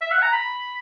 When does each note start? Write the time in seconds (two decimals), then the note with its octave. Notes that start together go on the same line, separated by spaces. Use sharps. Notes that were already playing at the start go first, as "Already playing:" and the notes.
0.01 E5
0.12 F#5
0.22 A#5
0.33 B5